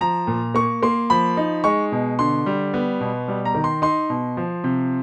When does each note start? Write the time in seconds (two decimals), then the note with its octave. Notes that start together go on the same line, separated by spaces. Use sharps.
0.01 F3 A#5
0.27 A#2
0.55 A#3 C#6
0.83 A#3 C6
1.10 F3 B5
1.37 D#4
1.64 G#3 C#6
1.92 B2
2.19 D3 C6
2.46 G3
2.74 B3
3.01 B2
3.28 G3
3.45 A#5
3.55 D#3
3.64 C6
3.82 D#4 C6
4.10 B2
4.37 F3
4.64 C3